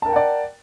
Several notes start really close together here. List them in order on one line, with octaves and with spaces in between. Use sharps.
A5 A#4 G5 F#5 D5